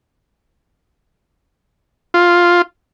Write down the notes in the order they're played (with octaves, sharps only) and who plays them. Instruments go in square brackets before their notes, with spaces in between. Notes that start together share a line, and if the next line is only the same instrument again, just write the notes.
[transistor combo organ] F4